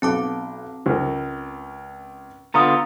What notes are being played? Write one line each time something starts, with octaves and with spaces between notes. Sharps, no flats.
B1 C4 A5 D6
C#2 A#4
D3 B3 F4 A#5 D#6